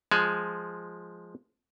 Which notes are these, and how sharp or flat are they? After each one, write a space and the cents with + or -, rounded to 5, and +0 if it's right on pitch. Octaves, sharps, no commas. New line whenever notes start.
F3 +0 G#3 +0 G#5 +25